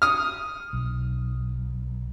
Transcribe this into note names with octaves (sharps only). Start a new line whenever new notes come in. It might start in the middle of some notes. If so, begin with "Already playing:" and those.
D#6 F6
B1